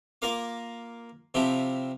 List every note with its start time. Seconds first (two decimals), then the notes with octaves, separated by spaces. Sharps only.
0.22 A#3 F4 A#4 F5 D6
1.34 C3 F3 E4 F4 G4